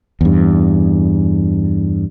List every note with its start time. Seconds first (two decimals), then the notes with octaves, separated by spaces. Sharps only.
0.21 E2 G2